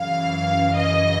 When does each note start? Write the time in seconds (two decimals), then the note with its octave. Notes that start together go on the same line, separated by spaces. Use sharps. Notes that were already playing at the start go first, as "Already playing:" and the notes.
Already playing: F#2 C#3 E3 F5
0.77 D#5